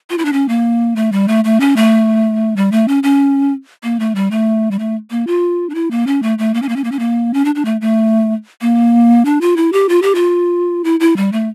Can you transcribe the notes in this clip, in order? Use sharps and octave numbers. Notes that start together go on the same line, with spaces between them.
F4
E4
D4
C#4
A#3
A3
G3
A3
A3
C#4
A3
G3
A3
C#4
C#4
A#3
A3
G3
A3
G3
A3
A#3
F4
D4
E4
A#3
C#4
A3
A3
A#3
C#4
A#3
C#4
A#3
C#4
A#3
C#4
D4
D4
A3
A3
A#3
D4
F4
E4
G4
F4
G4
F4
E4
E4
G3
A3